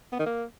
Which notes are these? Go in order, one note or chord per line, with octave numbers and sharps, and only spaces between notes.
B3
D#3
A#3